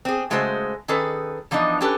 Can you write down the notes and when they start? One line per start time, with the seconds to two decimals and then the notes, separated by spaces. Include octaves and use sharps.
0.05 C4 G#4
0.30 C#3 G#3 A3 F#4 G#4 C5
0.88 D#3 C#4 G#4 A4 B4
1.51 E3 F3 B3 D4 D#4
1.81 C#4 D4 G4 A4 B4